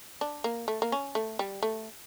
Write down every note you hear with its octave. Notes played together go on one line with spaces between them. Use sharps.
D4
A#3
A3
A#3
C#4
A3
G3
A3